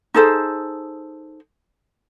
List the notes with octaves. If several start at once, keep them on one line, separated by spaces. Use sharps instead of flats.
D#4 G#4 A4 C5